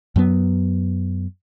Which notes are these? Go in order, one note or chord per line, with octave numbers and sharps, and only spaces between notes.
F#2 F#3 B3